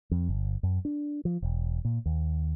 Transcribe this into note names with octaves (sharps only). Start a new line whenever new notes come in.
F2
G1
F#2
D4
F3
E1
A#2
D#2